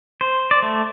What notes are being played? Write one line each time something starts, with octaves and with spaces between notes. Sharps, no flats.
C5
D5
A3